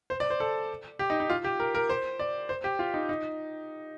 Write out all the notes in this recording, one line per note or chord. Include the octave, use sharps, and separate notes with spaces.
C5
D5
C5
A4
G4
D#4
D#4
F4
G4
A#4
A#4
C5
D5
C5
G4
F4
D#4
D#4